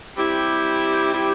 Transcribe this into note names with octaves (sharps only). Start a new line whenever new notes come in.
G3 C4 E4 G4
G3 C4 E4 G4